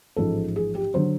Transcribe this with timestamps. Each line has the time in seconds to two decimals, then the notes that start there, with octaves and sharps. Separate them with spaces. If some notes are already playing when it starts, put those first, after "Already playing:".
0.16 A1 G#2 F3 A4
0.56 G#4
0.75 G4
0.94 D3 F#3 C5